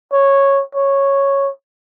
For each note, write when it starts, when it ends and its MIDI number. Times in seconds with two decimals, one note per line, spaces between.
0.13 0.63 73
0.75 1.50 73